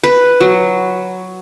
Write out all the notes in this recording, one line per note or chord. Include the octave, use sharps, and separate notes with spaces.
B4
F#3